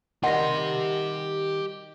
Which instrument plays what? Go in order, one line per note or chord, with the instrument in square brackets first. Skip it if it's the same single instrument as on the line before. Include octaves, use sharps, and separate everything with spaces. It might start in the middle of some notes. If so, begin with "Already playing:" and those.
[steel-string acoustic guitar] D#3 G3 [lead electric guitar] G4 C6 [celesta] D#5 A#6 [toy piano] F#5